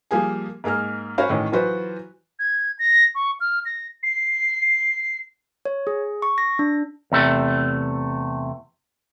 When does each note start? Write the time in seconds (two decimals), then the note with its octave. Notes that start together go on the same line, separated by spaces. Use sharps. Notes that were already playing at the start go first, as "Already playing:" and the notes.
0.11 F3 G3 A#3 G#4 G#5
0.64 G#2 A#3 G#4 A#4 F6
1.18 C#4 F#4 A#4 C5 F5 B5
1.30 A2 D#3 E3 C#4
1.52 E3 F#3 F4 F#4 B4 C5
2.39 G#6
2.79 A#6
3.15 C#6
3.40 F6
3.66 A#6
4.03 C7
5.65 C#5
5.87 G#4
6.22 C#6
6.38 A#6
6.59 D4
7.12 E2 C3 A3